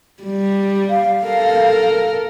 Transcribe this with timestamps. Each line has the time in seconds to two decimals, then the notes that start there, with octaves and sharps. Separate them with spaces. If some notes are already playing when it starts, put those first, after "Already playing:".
0.23 G3
0.90 F5
1.24 A4 A#4